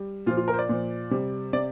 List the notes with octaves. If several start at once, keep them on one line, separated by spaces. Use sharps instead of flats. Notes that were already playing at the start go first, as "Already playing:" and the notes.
Already playing: G3
A#2 F3 F4
F4
A#4
C5
D5
A#2 F3
C3 G3
C3 D5